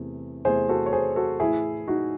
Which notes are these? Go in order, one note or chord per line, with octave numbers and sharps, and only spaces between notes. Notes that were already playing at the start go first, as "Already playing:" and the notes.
Already playing: E2 C3 A3
E2 C3 E3 A3 G#4 C5
F#4 A4
C#5
G#4 C5
F#4 A4
A2 E3 A3 E4 G#4
D#4 F#4